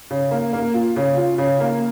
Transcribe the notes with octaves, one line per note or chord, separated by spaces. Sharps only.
C#3
A#3
A#3
F4
C#3
F4
C#3
A#3